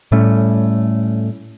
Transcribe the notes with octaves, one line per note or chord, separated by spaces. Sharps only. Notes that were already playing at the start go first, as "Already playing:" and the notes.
A2 G3 A3 C#4